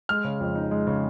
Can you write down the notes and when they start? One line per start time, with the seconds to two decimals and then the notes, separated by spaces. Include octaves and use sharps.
0.09 G#3 F6
0.24 C#3
0.40 F2
0.55 D#4
0.71 G#3
0.87 C#3